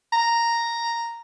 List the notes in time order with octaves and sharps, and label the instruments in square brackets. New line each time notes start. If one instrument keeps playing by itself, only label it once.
[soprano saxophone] A#5